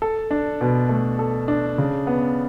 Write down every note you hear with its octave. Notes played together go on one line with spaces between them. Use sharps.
A4
D4
B2
A3
A4
D4
C#3
B3